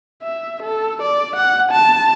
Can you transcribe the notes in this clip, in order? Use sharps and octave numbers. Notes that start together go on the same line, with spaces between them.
E5
A4
D5
F#5
A5